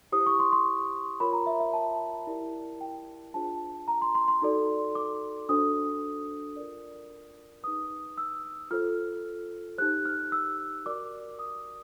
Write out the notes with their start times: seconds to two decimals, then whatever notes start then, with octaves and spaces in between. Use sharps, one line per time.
0.12 E4 G4 C5 D#6
0.26 C#6
0.40 C6
0.52 C6
1.20 F4 A#4 C#5 B5
1.33 A#5
1.47 E5
1.60 E5
1.73 A5
2.27 E4 G4 A#4 D5
2.81 G5
3.34 D4 F4 G#4 C5 A5
3.88 A#5
4.02 C6
4.15 C6
4.28 C6
4.42 D#4 F#4 A4 D5
4.95 D6
5.49 D4 F#4 A4 C5 D#6
6.56 F4 A#4 D5
7.63 D#4 G#4 B4 D#6
8.18 E6
8.71 F4 A4 C5 F6
9.78 D#4 G4 C5 F#6
10.05 F6
10.32 E6
10.85 F#4 A#4 D5 D6
11.39 D#6